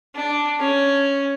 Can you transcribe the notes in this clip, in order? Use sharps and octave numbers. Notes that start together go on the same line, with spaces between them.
D4
C#4